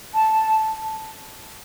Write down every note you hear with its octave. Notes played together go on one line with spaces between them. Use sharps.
A5